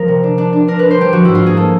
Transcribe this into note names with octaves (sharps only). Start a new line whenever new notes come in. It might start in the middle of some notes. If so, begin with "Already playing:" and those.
Already playing: F3 A#4
C3
D4
D4
D4
D4 A#4
D4 B4
C5
G3 G4
F3 F#4
G#2 E4
F4
A#3 G#4
A#3 A4